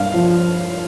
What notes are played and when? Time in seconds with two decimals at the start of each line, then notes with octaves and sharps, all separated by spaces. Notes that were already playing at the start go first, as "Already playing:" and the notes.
Already playing: G2 F5
0.14 F3